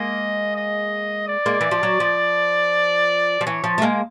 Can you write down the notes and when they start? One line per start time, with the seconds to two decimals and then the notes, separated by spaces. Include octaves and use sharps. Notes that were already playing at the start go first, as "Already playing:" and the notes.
Already playing: G#3 A#3 D#5
0.55 D#5
1.28 D5
1.46 G#3 A#3
1.61 E3
1.71 F3
1.83 F#3
2.00 F3
3.41 F3
3.46 E3 C#5
3.64 F3
3.78 A3
3.82 G#3 A#3